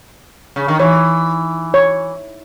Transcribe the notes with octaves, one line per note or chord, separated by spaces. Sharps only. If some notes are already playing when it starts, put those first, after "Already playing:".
C#3
D#3
E3 C#5
C#5